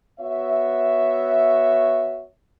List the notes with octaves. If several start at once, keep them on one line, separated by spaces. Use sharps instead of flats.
B3 F#4 C#5 E5